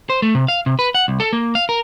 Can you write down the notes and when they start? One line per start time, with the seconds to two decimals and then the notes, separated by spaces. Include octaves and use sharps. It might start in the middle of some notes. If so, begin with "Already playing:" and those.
0.10 C5
0.22 A3
0.35 C3
0.48 F5
0.66 C3
0.79 B4
0.95 F#5
1.08 C2
1.20 A4
1.33 A#3
1.55 F5
1.69 A#4